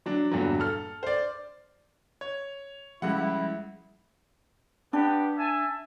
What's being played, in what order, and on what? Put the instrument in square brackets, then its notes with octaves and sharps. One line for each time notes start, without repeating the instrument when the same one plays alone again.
[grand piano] F#3 D4
E2 G2 A#2 D3 F#3
A4 F6
C5 D5
C#5
[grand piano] C#2 C#3 F#5 [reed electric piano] F3 G3 G#3 [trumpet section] E4
[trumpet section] B3 G4 [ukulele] D4
[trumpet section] E5 G#5 A5